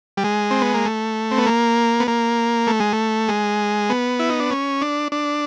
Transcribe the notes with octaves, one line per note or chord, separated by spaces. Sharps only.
G3
G#3
C4
B3
A#3
A3
C4
B3
A#3
B3
A#3
A3
G#3
A3
G#3
B3
E4
D#4
D4
C#4
D4
D4